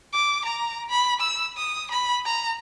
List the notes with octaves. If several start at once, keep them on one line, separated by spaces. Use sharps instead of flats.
D6
A#5
B5
E6
D#6
B5
A#5